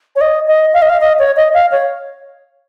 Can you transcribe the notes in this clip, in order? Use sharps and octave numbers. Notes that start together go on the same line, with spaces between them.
C#5
D#5
D#5
F5
D#5
F5
D#5
C#5
D#5
F5
C#5